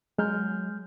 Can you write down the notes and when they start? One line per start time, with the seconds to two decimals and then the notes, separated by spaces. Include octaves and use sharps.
0.18 F#3 G#3 F6 G6